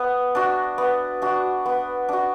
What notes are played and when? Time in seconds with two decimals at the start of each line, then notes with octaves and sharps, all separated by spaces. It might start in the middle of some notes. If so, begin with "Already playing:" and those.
Already playing: B3
0.35 D4 F#4
0.78 B3
1.22 D4 F#4
1.66 B3
2.09 D4 F#4